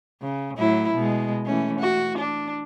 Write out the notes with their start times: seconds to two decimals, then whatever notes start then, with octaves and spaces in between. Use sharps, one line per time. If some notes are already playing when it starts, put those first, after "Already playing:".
0.22 C#3
0.58 A2 F#3 E4
0.94 B2 G#3
1.46 E3 A3 C#4
1.80 F#4
2.18 D4